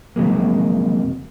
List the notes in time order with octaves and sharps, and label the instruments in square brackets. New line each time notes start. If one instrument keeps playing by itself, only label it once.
[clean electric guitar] F2 C3 F#3 G#3 A#3